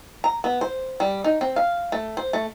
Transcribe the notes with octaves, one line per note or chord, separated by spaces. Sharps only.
A#5
B3
C5
G3
D#4
C4
F5
A3
C5
A3